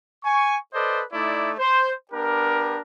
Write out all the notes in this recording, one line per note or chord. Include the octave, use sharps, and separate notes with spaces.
G#5 C#6
A4 B4 C5 D5 D#5
A3 D#4 E4 D5
C5
B3 D4 G4 A#4